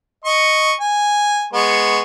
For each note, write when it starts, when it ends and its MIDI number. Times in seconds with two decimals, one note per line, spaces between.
0.25 0.74 75
0.25 0.74 85
0.80 1.46 80
1.53 2.01 56
1.53 2.01 59
1.53 2.01 85